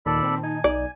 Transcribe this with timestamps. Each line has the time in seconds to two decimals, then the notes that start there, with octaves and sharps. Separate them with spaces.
0.06 D#2 A#2 D#3 A4 D5 A5 B5
0.23 C4
0.43 D#4 G#5
0.64 B1 D#4 D5